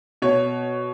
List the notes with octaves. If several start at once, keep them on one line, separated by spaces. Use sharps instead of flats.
B2 C#5